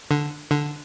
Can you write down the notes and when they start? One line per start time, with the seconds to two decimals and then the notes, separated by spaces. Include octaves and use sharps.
0.11 D3
0.51 D3